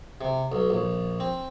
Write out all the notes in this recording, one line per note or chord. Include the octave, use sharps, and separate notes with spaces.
C3
B1
A#1
C4